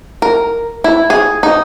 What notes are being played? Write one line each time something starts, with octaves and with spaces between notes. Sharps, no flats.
A#4
E4
G#4
D#4